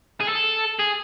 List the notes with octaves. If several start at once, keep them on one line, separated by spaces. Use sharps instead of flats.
G#4
A4
G#4